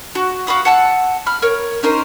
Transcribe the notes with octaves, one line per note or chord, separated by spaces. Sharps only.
F#4
F#4 F5 B5 D#6
F#5 A5 E6
B5 F6
A#4 C#5
C#4 D#4 A#4 C5